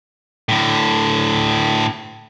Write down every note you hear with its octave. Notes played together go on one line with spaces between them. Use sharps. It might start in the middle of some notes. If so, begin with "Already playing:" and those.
A2 D3